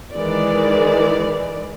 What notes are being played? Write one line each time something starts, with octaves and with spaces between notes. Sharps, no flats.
D#3 E3 G#3 D5